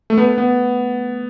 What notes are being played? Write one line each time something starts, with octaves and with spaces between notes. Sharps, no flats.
A3
B3
B3